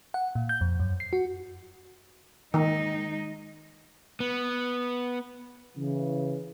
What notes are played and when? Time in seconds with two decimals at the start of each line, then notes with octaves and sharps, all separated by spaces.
0.14 F#5
0.35 A#2
0.49 G6
0.61 F2
0.80 F#2
1.00 C7
1.13 F#4
2.54 D#3 G#3 D#4
4.20 B3
5.77 C#3 E3